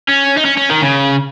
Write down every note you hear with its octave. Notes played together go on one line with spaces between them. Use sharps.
C#4
D#4
C#4
C#4
D#3
C#3